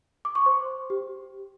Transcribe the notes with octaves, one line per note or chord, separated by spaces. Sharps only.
D6
C#6
C5 C6
G4